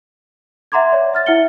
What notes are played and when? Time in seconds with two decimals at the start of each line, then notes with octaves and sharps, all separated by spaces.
0.72 E5 F#5 A#5 C6 D6 G#6
0.92 C#5 D5
1.13 E5 F6 A6
1.26 E4 E5 F#5 F6 C#7 G7